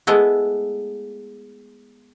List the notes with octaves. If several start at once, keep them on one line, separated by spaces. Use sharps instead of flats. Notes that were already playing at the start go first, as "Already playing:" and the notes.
G#3 A3 B3 E4